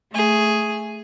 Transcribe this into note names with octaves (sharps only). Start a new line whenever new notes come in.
A3 G#4